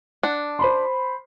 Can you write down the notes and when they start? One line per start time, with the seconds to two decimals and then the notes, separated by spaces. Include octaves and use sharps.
0.23 D4 F#5
0.59 C5 B5 C6